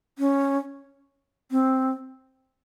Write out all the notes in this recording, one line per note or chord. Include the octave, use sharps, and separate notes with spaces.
C#4
C4